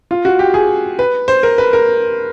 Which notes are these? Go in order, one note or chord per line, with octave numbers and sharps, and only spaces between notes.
F4
F#4
G4
G#4
B4
C5
A#4
B4
A#4